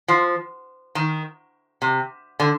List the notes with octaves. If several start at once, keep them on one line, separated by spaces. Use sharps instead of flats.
F3
D#3
C3
D3